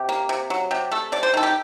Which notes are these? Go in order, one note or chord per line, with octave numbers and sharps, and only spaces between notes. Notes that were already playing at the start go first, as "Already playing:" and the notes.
Already playing: C3 G4
A#3
C3
F#3
C3 G4
A3 A4
C3 D5
C5
D#3 A4
G4